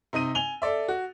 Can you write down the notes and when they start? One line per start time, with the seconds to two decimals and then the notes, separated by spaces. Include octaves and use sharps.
0.13 C3 D#4 D#5 D#7
0.35 G#5 F7 G7
0.62 A4 D5 E5
0.88 F#4